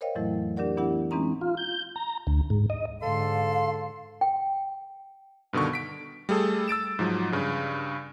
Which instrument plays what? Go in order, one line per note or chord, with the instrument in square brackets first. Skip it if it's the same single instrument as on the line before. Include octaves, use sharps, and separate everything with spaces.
[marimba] A#4 C5 C#5 D#5 F5 G5
F2 A2 E3 F#3 A3 E4
D4 G4 A#4 D5 F#5
E3 B3 D4 E4 G4 F#5
E3 G#3 C4 C#4 D#4 A#5
[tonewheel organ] F4
G6
A#5
D2
G#2
D#5
[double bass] G#2 D3 [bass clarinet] A4 [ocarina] F5 [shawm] C6
[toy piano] G5
[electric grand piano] G2 B2 D3 D#3 C#6
B6 D7
G3 A3 G#4 A4
E6 A6 D7 E7
G#2 F3 F#3
G2 C#3